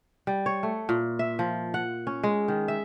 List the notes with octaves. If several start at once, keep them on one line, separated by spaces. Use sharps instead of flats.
G3
C#5
A3
A#2
E5
F3
F#5
C#4
G#3
D#3
E5